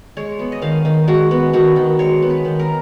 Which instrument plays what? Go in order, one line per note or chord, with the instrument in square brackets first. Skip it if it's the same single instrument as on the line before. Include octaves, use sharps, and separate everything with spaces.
[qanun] G#3 C#5
B3
D#5
D#3 F5
D#3
G#3 F#4
B3
D#3 F#4
D#3
G#3 C#5
B3
B4
D#3
A#4